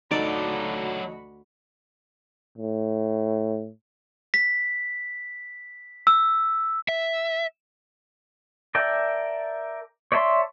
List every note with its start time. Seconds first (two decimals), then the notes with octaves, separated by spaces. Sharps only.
0.11 D2 F#3 D#4 F#4 A4 D5 B5
2.58 A2
4.34 B6
6.07 E6
6.89 E5
8.75 A#4 D5 E5 G5 A5
10.12 C#5 D5 E5 A5 C6